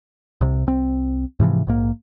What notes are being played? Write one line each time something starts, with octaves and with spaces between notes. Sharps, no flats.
C2 C3
C2 C4
G#2 C3 E3 F3
A#1 G#2 A#3